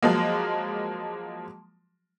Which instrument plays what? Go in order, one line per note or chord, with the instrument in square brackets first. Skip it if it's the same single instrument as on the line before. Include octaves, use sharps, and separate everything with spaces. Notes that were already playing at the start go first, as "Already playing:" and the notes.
[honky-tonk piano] F3 F#3 G#3 A#3